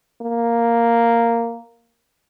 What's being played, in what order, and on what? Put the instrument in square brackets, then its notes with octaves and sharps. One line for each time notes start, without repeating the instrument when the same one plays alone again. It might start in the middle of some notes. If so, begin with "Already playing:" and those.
[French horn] A#3